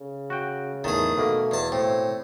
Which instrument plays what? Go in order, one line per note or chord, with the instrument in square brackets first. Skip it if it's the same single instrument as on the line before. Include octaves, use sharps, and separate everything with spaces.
[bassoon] C#3
[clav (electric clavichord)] F#4 G5
[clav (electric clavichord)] E2 A2 A5 [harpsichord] D#3 G#4
[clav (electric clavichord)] B2 A#3 [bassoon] A3
[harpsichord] E2 A5
[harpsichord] A2 [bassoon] C4